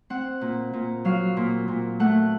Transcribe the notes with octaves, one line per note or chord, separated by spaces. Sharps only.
C4 F#5
A#2
A#2
F#3 F5
A#2
A#2
A3 F#5